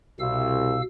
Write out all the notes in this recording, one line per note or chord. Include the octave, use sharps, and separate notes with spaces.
C2 B2 F5 E6